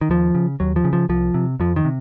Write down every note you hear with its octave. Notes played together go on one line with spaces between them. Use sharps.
D#3
D#2 F3
C#3
D#2 F#3
F3
C#3
F3
C2 F3
C3
F2 F3
D#3
C3